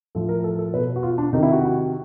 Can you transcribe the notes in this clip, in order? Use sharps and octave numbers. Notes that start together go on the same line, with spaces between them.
A2 F3 A4
A#4
A4
A4
B2 B4
F#4
F4
D4
C3 D#3 D#4
E4
F#4